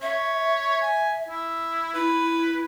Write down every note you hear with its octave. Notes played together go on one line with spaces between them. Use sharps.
C#5 E5
G#5
E4
E4 B4